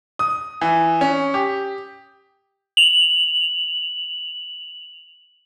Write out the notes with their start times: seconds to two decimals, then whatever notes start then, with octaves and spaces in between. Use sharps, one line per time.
0.19 D#6
0.61 E3
1.01 C#4
1.34 G4
2.77 F7 F#7